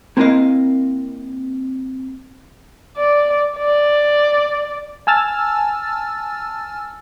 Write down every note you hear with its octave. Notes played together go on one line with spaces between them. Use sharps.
A#3 C4 E4 A#4 D#5 F5
D5
D5
G#5 A5 E6 F6 A6